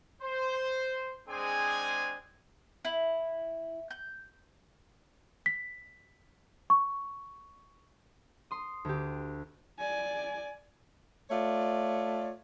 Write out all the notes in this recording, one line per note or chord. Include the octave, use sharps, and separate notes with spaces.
C5
G#3 C4 D4 G#4 C5 G#5
E4
G6
B6
C#6
C6 D#6
D2 G4
D5 G#5
A3 F4 C#5 D5